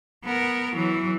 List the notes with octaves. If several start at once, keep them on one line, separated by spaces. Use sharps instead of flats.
B3 A#4
E3 F#3